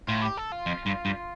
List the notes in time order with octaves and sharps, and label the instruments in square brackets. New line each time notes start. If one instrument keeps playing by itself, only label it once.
[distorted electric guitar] A2 [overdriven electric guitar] F4
[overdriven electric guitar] G4
A4
F4
[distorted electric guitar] F2
G2
G2